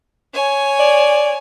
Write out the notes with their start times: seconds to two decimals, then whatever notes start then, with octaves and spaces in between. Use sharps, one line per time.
0.34 C#5 G#5
0.80 D5